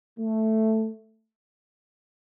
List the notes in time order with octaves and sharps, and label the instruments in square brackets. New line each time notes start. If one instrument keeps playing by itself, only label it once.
[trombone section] A3